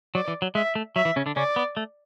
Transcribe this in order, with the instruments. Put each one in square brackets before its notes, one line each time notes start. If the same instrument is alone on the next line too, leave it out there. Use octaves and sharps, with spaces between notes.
[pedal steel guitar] F#3 [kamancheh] D5
[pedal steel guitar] E3
F#3
[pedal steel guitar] G#3 [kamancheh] E5
[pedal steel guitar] A3
[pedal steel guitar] F#3 [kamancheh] E5
[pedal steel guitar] E3
C#3 C#4
D3 D4
[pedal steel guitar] C#3 C#4 [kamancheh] D5
[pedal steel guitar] B3
A3